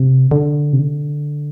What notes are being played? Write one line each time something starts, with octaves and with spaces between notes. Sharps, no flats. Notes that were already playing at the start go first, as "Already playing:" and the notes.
Already playing: C3
D3
C3
D3